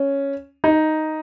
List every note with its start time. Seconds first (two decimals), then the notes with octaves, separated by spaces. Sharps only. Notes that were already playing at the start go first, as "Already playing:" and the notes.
Already playing: C#4
0.64 D#4